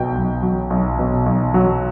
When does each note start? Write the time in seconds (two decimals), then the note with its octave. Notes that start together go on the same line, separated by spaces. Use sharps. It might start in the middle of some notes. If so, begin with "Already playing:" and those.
Already playing: B1 B2 G5
0.15 B1
0.42 F#3
0.70 B1
0.99 B2
1.26 B1
1.54 F#3